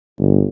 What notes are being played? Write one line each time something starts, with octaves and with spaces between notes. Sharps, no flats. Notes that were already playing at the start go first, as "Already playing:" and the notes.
G1